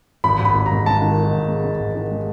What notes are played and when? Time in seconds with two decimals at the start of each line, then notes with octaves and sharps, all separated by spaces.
0.24 G#1 B5
0.39 G#1
0.45 B5
0.55 G#1
0.66 A#5
0.71 G#2
0.86 G#2 A5
1.02 D#3
1.18 D#3
1.34 G#2
1.49 G#3
1.65 G#2
1.80 G#1
1.95 D#3
2.11 G#3